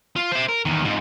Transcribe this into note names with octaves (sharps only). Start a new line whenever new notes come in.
F4
C5 E5
A#4
E2 D#3
F2 G#2